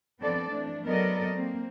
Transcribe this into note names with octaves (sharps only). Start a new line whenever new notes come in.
F3 B3 C4 D4 A4 D5
E3 A3 D4
F#3 B3 A4 A#4 D5 D#5
A#3 C4